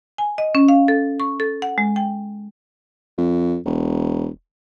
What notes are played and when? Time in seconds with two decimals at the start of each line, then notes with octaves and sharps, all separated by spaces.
0.18 G#5
0.38 D#5
0.55 C#4
0.68 F5
0.88 A4
1.20 C#6
1.40 A4
1.62 F#5
1.78 G#3
1.96 G5
3.18 F2
3.65 E1